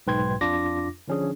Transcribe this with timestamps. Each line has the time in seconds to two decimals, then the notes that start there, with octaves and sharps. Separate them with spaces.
0.07 B1 G#2 B4 G5 C6 G#6
0.41 F2 D4 F4 D6 A#6
1.08 D3 F3 C#4 D4 G#4